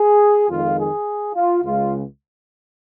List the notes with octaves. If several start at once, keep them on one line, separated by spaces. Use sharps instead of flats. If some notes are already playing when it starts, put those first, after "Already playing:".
Already playing: G#4
F2 D#3 G#3 F4
G#4
F4
C#2 C#3 G#3 F4